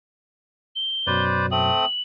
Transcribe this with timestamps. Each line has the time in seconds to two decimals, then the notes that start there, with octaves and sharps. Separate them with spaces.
0.76 G7
1.07 F#2 B2 F#3 B4 C5 D5
1.51 A3 C4 D#6 F#7